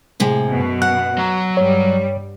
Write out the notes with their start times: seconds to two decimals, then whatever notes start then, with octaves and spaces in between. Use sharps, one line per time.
0.20 A2 C3 G#3
0.49 F#2 B2
0.82 F#5 F#6
1.18 F#3 A#5
1.57 G2 G3 C#5